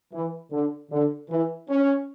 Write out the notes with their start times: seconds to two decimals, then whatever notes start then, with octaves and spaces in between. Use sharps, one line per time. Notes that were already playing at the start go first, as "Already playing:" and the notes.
0.13 E3
0.52 D3
0.92 D3
1.31 E3
1.70 C#4